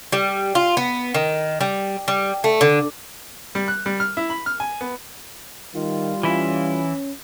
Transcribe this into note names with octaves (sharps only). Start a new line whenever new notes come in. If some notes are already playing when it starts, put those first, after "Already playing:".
G3
F4
B3
D#3
G3
G3
A3
D3
G3
F#6
G3
F6
E4
B5
F6
G#5
B3
D#3 G3 F4
E3 C#4 E4